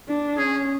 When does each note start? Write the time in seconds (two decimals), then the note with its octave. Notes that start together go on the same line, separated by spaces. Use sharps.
0.08 D4
0.38 C#4 G#4